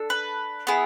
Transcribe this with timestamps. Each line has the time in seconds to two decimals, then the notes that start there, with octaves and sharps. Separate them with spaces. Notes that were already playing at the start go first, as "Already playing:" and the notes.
Already playing: D4 A4
0.10 B4
0.67 B3 E4 G#4